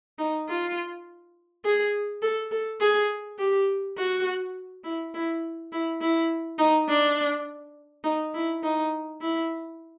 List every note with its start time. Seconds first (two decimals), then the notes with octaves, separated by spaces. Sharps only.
0.19 D#4
0.49 F4
1.65 G#4
2.23 A4
2.51 A4
2.81 G#4
3.39 G4
3.98 F#4
4.84 E4
5.14 E4
5.73 E4
6.01 E4
6.59 D#4
6.89 D4
8.04 D#4
8.34 E4
8.63 D#4
9.21 E4